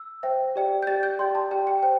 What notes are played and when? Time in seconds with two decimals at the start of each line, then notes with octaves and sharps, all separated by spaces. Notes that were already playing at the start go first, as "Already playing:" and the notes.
Already playing: E6
0.23 C5 E5 G5
0.56 G4 D5 G5
0.83 G6
0.87 G4 D5 G5 A6
1.03 G6
1.19 G4 D5 G5 C6
1.35 A5
1.51 G4 D5 G5 A5
1.67 G5
1.83 C5 G5